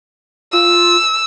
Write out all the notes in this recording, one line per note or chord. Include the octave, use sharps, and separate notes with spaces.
F4 E6